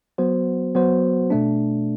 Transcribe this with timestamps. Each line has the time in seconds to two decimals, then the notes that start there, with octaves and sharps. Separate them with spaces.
0.18 F#3 B3 F#4 C5
0.75 F#3 B3 F#4 C5
1.30 B2 A3 D4